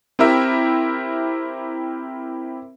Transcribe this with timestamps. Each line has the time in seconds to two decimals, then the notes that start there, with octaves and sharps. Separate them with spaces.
0.19 C4 E4 G4 A#4 E5